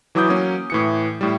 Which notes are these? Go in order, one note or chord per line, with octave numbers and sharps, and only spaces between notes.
E3 F#3 E4 D6 D#6 G6
F#3 A#3 C#4
A2 E3 C#7
A2 G3